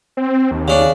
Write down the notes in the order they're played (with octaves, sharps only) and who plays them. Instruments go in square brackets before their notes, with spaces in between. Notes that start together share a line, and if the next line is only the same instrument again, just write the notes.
[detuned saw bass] C4
D#2
[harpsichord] C#3 D4